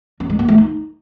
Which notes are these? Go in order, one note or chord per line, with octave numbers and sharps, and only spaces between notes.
C#4
G#3
A#3
A3
D#4